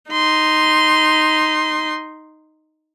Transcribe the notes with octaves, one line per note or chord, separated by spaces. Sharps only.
D#4 C6